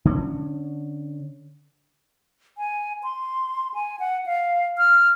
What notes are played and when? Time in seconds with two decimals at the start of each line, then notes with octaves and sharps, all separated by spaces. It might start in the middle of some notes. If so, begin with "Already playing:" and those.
0.05 D3 C4 C#4
2.58 G#5
3.03 C6
3.74 G#5
4.00 F#5
4.26 F5
4.78 F6